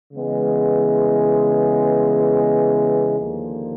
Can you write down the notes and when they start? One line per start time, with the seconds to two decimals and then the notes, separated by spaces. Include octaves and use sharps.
0.12 C#3 E3 G#3 B3
3.18 D#2 D3 F3 A#3